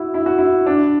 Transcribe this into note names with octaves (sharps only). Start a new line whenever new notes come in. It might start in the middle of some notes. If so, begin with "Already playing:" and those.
Already playing: E4 F#4
E4
F#4
E4
D4